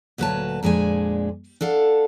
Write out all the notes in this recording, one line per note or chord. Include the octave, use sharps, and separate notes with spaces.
D2 A#2 F#3 B4 C#5 A5
F2 A#2 G#3 D4 G#5
D4 A4 F5 F#5